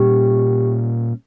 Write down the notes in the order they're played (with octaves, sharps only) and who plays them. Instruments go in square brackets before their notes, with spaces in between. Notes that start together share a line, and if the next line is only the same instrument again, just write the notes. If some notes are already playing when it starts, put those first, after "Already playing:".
Already playing: [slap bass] A#2 G3 C#4 [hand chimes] G4